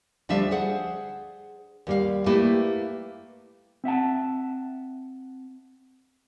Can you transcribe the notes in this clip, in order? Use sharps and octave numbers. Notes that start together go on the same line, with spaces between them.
D2 F3 G3 D4 E5 F5
G#4 C5 F#5
D#2 G3 F5
A3 A#3 E4 G4 B4
C4 E5 F#5 A5